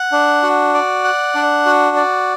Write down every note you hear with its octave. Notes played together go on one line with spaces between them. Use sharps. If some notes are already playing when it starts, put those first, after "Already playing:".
Already playing: F#5
D4
F#4
D5
F#5
D4
F#4
D5